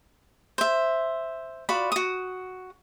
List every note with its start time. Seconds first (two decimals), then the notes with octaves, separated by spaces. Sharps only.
0.58 C5 E5
1.69 F4 F#4 D5 B5
1.92 F#4 D#6